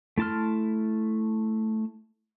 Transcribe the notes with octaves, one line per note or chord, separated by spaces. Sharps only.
A3 E4 A5 C6 F6